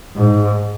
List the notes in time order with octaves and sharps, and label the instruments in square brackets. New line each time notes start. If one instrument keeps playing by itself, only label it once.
[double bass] G#2